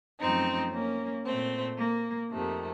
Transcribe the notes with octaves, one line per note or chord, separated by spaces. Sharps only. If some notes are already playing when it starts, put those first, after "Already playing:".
F#2 F3 A3 C4 D#4
A#3 C#4
A#2 A3 C4
A#3
F2 C3 D#3 A3